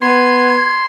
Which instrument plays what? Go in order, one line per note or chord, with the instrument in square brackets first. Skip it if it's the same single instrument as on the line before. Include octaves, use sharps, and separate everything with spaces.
[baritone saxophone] B3 [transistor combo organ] C6 [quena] G#6